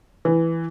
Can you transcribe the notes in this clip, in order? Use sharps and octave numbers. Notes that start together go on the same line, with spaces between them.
E3